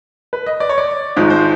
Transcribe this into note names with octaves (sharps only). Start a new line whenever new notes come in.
B4
D#5
D5
C#5
D5
G#1 G#2 F3 G#3
C5